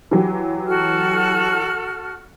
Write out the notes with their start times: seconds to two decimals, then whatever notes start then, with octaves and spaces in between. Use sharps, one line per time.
0.11 E3 F#3 G4
0.67 F#4 A4 F6